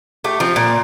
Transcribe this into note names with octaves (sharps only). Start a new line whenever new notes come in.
A3 G4
F3 C4
A#2